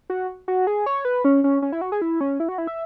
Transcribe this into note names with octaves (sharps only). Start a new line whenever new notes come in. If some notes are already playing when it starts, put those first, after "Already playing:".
F#4
F#4
G#4
C#5
B4
C#4
C#4
C#4
E4
F#4
G#4
E4
C#4
E4
F#4
E4
E5